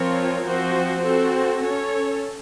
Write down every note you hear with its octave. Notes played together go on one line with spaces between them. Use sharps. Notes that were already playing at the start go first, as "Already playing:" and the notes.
Already playing: F3 C4 F4 A#4 C#5
F3 C4 F#4 C5
C4 F#4 A4 C5
C#4 A4 C#5